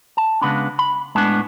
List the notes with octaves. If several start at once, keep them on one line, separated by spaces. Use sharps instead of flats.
A5
C#3 G#3 B3 D4 B5
B5
A2 G#3 B3 D4 A5